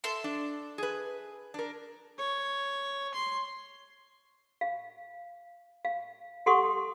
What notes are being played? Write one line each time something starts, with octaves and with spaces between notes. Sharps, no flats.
A4 E5 C6
D4
G#4 B4
D4 A#4
C#5
C6
F5
F5
G4 A4 F#5 C6 C#6 D#6